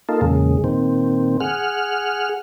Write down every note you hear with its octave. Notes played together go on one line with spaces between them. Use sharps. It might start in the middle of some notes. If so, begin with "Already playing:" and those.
A#3 D#4 F4 A4
E2 A#2 C#3 G#3
A#2 D#3 C4
G#4 F#5 F6